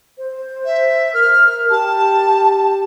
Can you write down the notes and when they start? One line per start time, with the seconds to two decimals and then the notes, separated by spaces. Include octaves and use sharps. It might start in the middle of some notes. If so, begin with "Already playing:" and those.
0.18 C5
0.65 E5
1.14 A#4 F6
1.70 G4 A5